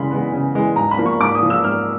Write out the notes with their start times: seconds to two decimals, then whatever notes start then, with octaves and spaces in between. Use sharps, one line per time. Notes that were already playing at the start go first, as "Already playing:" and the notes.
Already playing: C#3 E3 G#3 B3 B5 C6
0.11 E3 G#3 B3
0.33 C#3
0.55 E3 G#3 B3
0.76 G#2 A#5
0.91 B5
0.98 F3 A#3
1.06 C#6
1.20 G#2 D6
1.35 D#6
1.43 F3 A#3
1.50 E6
1.64 G#2 F6